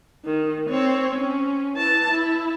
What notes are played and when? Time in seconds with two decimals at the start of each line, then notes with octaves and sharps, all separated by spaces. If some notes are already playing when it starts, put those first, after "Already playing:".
0.25 D#3
0.69 C4 C#5
1.15 C#4
1.76 E3 A5
2.10 E4